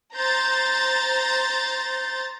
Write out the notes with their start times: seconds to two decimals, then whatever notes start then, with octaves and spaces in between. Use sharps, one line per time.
0.15 C5 A#5 C6 G6 A6